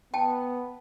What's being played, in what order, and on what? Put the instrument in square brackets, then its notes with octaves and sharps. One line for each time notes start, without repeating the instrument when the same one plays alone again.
[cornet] B3 [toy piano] G5 A5